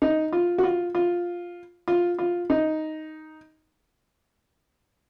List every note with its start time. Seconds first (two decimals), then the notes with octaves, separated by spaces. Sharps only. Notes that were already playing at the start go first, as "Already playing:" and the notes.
0.02 D#4
0.33 F4
0.58 F#4
0.63 F4
0.95 F4
1.88 F4
2.19 F4
2.50 D#4